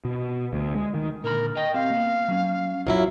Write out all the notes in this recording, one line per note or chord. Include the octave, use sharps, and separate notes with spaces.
B2
D2
G#3
D#3
A#2 D3 A#4 B5
A#4 D#5 G5
C4 G4 F5
A#3 B3
F#3 C#4
F#2 F#3 E4 F4